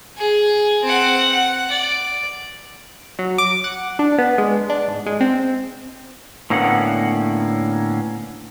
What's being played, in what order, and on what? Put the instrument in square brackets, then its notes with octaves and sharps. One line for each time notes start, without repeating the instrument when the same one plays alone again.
[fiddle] G#4
C4 F#5
F#5
D5
[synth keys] F#3
D6
F#5
D4
B3
G#3
D4
G#2
G#3
C4
[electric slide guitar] A2 D3 A#3 B3 C#4 F#5